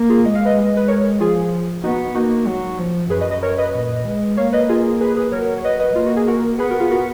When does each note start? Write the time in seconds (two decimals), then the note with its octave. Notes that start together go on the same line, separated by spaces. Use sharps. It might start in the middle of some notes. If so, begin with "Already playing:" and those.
Already playing: A#3
0.10 F4 G#4
0.25 G#3 D#5
0.35 F5
0.45 B4 D#5
0.56 G#3
0.77 B4
0.88 A#4 C#5
1.20 F3 F4 G#4
1.83 B3 D#4 F#4
2.15 A#3 D#4 F#4
2.47 F#3
2.79 F3
3.10 F#2 G#4 B4
3.21 B4 D#5
3.31 B4 D#5
3.42 A#4 C#5
3.57 B4 D#5
3.74 A#2
4.05 G#3
4.37 A#3 C#5 F5
4.52 B4 D#5
4.69 F4 G#4
5.01 G#4 B4
5.17 G#4 B4
5.32 F#3 A#4 C#5
5.57 C#5
5.64 B4 D#5
5.80 B4 D#5
5.95 A#3 F4
6.06 F#4
6.16 G#4
6.27 F#4 A#4
6.59 B3 G#4 B4
6.70 F#4 A#4
6.80 F4 G#4
6.91 F#4 A#4